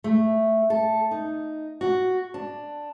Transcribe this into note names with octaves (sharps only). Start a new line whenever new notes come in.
A3
A4
D#4
F#4
D4